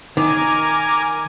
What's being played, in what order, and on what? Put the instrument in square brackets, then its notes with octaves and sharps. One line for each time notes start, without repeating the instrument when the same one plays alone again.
[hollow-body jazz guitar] D#3 [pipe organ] A#4 G#5 [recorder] D6